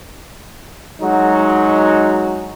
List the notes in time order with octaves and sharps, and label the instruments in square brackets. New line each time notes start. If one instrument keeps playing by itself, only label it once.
[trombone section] F#3 G#3 D#4 F#4